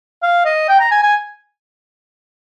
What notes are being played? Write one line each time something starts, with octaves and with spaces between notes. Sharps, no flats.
F5
D#5
G5
A#5
G#5
G#5